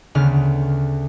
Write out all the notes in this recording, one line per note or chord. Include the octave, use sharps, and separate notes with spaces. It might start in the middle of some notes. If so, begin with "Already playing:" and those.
D2 C#3 B3 F6